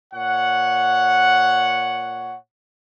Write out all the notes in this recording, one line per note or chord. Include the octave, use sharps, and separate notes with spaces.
A#2 C#5 F#5